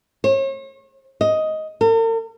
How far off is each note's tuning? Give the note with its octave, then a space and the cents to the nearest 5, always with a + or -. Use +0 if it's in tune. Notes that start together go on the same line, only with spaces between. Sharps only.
C#5 -40
D#5 +10
A#4 -45